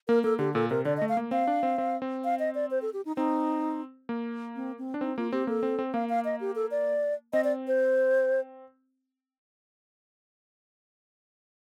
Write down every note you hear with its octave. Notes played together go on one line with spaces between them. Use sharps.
A#3 A#4
A#3 A4
D3 G4
A#2 A4
C3 A#4
D3 D5
D#5
A3
F5
A#3
C4 F5
D4
C4
C4
C4
F5
D#5
D5
C5
A4
G4
D#4
C4 D#4
A#3
C4
C4
D4
C4 D#4
A#3 F4
C4 G4
A#3 A4
C4
C4
A#3 F5
F5
D#5
G4
A4
D5
C4 D#5
D5
C5